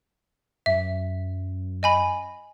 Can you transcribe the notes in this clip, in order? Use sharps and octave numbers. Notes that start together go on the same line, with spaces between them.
F#2 E5
D#5 G#5 B5